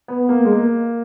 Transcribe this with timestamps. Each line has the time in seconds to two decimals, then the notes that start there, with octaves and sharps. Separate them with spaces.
0.08 B3
0.29 A#3
0.45 G#3
0.52 A#3